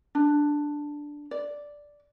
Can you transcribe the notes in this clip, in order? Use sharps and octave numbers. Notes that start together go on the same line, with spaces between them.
D4
D5